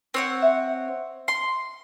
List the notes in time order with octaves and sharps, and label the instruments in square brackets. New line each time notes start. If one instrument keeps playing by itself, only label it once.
[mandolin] C4 C#5 F#5
[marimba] E5
[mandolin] C6